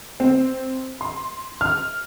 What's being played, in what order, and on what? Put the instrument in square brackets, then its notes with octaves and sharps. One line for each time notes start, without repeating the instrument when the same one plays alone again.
[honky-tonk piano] C4
C6
F6